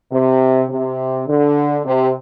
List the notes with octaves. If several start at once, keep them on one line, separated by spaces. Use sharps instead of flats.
C3
C3
D3
C3